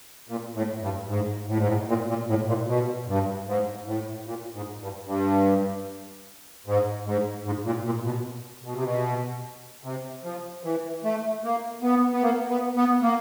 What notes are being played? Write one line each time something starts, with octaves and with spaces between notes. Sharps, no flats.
A#2
A2
G2
G#2
A2
G#2
A2
A#2
A#2
A2
A#2
B2
G2
G#2
A2
A#2
G#2
G2
G2
G#2
G#2
G#2
A#2
A#2
B2
B2
C3
B2
C3
F3
E3
A3
A#3
B3
B3
A#3
B3
B3
A#3